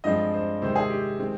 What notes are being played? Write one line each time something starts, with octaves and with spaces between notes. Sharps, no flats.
G2 F3 G#3 C4 D#5
C5
C3 D#3 G#3 C4 C5
G#4
G4
D#3 G#3 C4